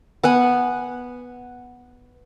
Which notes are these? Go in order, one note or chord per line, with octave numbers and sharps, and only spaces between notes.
B3 F#5 G#5